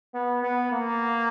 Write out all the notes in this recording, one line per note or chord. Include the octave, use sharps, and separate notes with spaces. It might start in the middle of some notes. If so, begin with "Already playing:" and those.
B3
B3
A#3